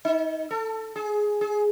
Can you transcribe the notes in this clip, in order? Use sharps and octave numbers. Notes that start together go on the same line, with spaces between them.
D#4
A4
G#4
G#4